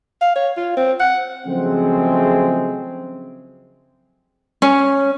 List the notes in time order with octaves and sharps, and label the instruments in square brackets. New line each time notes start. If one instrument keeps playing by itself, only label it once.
[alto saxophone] F5
C#5
F4
C4
F#5
[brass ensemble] C#3 F3 F#3 G#3 A3 C4
[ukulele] C#4